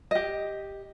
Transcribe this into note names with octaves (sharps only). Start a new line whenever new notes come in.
G4 D#5